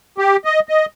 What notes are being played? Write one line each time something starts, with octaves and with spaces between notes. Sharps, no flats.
G4
D#5
D#5